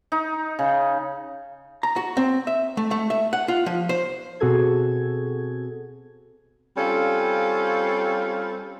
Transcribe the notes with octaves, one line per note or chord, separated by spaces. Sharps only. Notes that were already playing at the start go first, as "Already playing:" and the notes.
D#4
C#3
A#5
F#4
C4
E5
A3
A3
E5
F#5
F4
F3
C5
B2 C4 F#4 G#4 A4 G#6
G3 C4 C#4 F4 A4 F5